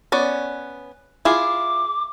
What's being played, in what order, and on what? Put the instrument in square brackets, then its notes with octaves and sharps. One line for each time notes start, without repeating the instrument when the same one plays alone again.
[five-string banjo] B3 C#4 D5
[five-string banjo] E4 F4 G#4 [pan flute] D6